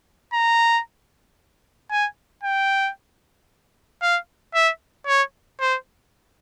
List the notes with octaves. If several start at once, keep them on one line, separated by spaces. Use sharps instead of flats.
A#5
G#5
G5
F5
E5
C#5
C5